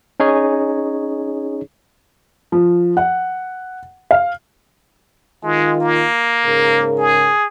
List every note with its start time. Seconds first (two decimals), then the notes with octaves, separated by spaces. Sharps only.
0.20 C#4 D#4 G#4 C#5
2.52 F3
2.97 F#5
4.11 F5
5.43 D#3 G#3 F4
5.81 A#3
6.45 G#2 C#3 A#4
6.98 G#4